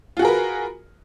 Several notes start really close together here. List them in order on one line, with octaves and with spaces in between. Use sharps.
F4 F#4 G#4 A#4 B4